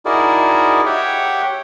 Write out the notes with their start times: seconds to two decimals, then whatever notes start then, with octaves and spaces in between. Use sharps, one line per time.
0.06 D#4 E4 F#4 G#4 A#4 D5
0.86 G4 C#5 E5 F#5 G5